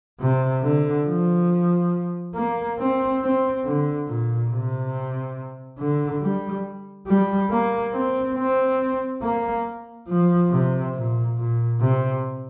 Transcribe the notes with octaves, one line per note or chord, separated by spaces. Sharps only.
C3
D3
F3
A#3
C4
C4
D3
A#2
C3
D3
G3
G3
A#3
C4
C4
A#3
F3
C3
A#2
A#2
C3